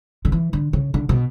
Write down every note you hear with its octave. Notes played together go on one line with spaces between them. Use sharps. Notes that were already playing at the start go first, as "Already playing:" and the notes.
D3
E3
D3
C#3
D3
B2